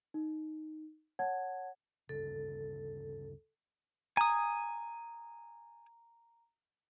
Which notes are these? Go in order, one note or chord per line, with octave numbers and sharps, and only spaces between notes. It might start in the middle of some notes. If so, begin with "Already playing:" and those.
D#4
C#5 F#5 A5 G#6
D2 G2 C#3 A4
G#5 A#5 D#6